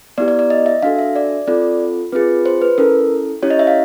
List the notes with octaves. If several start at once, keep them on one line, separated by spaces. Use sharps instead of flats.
B3 E4 G4 D5
D5
D5
D#5
E5
D4 F#4 A4 F5
E5
D5
C4 F4 A4 D5
C4 F4 G#4 B4
C5
B4
C#4 E4 A4 A#4
C#4 E4 G4 C#5
D#5
E5
F5